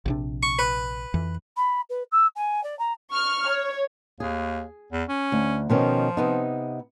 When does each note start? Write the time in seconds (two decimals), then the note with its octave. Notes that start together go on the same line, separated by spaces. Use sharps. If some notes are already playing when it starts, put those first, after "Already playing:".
0.06 A#1 C3 D4
0.43 C#6
0.59 B4
1.14 F2 E3
1.57 B5
1.89 B4
2.11 E6
2.36 G#5
2.63 D5
2.79 A#5
3.12 C#6 F6
3.48 C#5
4.20 D#2 G#4
4.92 E2
5.09 C#4
5.32 D2
5.70 B2 D#3 F3 C#4
6.17 C3 B3 D#4